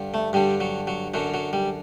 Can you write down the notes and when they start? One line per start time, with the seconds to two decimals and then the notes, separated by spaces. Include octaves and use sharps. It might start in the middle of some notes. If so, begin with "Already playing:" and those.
Already playing: G2 D3
0.14 A3
0.33 G2 D3 G3
0.60 F#3
0.87 F#3
1.14 F#2 D3 F#3
1.34 F#3
1.53 G3